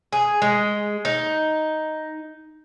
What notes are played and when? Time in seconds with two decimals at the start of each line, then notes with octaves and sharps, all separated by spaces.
0.12 G#4
0.42 G#3
1.05 D#4